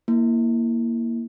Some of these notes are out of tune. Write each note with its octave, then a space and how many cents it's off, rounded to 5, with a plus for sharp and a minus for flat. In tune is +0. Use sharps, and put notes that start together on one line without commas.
A#3 +0 E4 +0